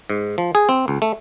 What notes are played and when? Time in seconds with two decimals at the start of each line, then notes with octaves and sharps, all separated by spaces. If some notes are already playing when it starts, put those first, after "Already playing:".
0.10 G#2
0.38 F3
0.55 G#4
0.69 C4
0.88 C#2
1.02 A3